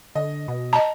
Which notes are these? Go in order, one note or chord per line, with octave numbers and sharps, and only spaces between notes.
D3 D#5
B2
D#5 A5 A#5